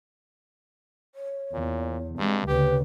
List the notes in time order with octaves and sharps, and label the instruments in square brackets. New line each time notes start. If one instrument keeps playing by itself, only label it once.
[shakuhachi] C#5
[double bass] E2 [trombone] A#2
[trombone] G2 [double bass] G#3 [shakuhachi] C4
[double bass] D2 C#3 [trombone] G4 [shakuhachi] B4